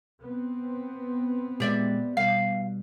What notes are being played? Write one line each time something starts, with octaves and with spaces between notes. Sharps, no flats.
B3 C4
A#2 G#3 G4 D5 E5
B2 G3 F5